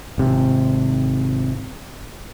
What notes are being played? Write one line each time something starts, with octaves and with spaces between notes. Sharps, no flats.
G#1 C3